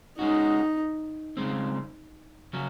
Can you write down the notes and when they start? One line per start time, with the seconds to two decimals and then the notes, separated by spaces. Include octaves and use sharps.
0.18 G#3 C#4 D#4 F#4
1.37 C#3 G#3 C4
2.53 C#3 F#3 C#4